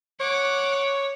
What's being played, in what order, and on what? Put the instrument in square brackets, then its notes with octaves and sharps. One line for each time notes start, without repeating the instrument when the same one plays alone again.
[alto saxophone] C#5 [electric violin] F#5 D6